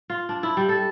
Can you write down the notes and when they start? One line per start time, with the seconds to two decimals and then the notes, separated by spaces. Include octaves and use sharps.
0.10 F4
0.29 D4
0.43 E4
0.57 G3
0.69 A4